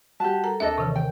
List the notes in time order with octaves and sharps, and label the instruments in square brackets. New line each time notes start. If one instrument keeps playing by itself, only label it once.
[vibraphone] G3 F#4 F#5 [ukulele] G4 A5
[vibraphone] A4 A#4 [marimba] A#5
[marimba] D#2 E5 [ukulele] D4 A4 D#5 [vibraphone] A#4
[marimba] C3 D#3 E3
[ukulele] G5